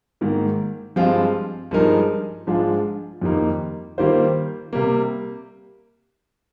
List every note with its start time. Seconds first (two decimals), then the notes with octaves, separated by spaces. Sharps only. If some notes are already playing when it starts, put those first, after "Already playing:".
0.21 G#2 D#3 A#3
0.96 G2 F3 G#3 C4 F4
1.71 G2 F3 G#3 D#4 A#4
2.47 G#2 F3 G#3 D4 F4
3.22 F2 D#3 G3 A#3 D#4
3.98 D#3 G3 A#3 F4 C5
4.73 C3 G3 A#3